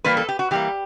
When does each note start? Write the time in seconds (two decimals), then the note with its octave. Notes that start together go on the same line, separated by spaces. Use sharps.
0.04 E3 G3 A#3 B4
0.17 A4
0.29 G4
0.39 F#4
0.51 E3 G3 A#3 G4